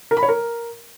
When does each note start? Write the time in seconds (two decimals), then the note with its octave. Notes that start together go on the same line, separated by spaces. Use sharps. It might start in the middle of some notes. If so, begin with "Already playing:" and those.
0.11 A#4
0.17 B5
0.23 C#5
0.28 A#4